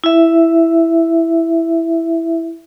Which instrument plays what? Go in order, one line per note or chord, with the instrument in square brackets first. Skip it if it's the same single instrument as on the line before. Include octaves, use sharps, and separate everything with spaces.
[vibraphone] E4 E5